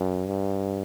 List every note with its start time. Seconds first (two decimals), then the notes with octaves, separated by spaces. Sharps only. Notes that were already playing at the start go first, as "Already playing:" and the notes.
Already playing: F#2
0.27 G2